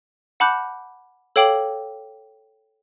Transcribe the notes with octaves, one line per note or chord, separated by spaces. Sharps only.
F#5 A5 B5 D6 F#6 G6
A4 C#5 F5 G5 D6 F#7